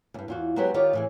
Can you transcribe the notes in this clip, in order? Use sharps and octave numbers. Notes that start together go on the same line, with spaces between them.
E2 G2
E2 F4 F#4
F#3 G#3 B3 F#4 G4 C#5
D#3 F4 G4 C#5 D5
A2 E3 G#4